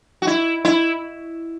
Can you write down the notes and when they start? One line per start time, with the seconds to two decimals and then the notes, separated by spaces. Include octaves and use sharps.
0.22 F#4
0.27 E4
0.65 E4